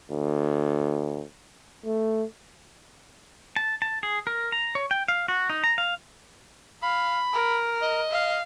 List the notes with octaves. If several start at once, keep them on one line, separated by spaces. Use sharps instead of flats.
D2
A3
A5
A5
G#4
A#4
A#5
C#5
G5
F5
F#4
D#4
A#5
F5
F5 B5
A#4
D#5
F5